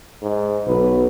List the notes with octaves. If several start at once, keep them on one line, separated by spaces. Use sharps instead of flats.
G#2
B1 B4